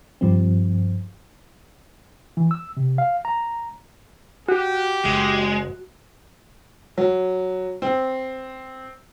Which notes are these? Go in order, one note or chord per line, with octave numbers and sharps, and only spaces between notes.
G2 F3 C4
E3
E6
C3
F5
A#5
F#4 G4
F#1 G#3
F#3
C4